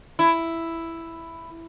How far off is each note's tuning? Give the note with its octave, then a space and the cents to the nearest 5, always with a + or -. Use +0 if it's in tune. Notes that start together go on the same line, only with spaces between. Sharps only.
E4 +5